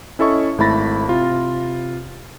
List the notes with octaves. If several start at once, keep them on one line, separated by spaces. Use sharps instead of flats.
C#4 E4 A4 D#5 C#6
G#1 A3 E4 B5 A6 A#6
C3 F4